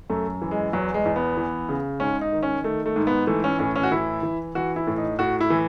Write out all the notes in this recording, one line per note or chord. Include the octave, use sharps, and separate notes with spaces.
F#2 A3
E3
G#3
E2 F#3
G#3
E2
B3
E3
C#3
G#2 C#4
D#4
D#3
C#4
D#3 A3
A3
G#2
B3
E3 A3
C#4
A2 C#4
C#4
F#4
E3 E4
E3
E3 F#4
E4
A2
D#4
A2 F#4
E4
E3